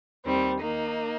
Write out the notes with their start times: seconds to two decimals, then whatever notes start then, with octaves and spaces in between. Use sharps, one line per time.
0.25 D#2 D#3 G3 C4
0.62 D#2 D#3 A#3 D#4